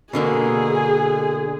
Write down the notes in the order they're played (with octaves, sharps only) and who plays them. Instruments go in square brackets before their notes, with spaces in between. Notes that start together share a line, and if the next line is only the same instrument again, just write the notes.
[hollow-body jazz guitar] B2 D3 A#3 [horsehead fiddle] G#4